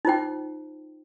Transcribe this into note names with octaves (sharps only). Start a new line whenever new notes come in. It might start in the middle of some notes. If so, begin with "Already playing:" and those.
D#4 F4 C5 G5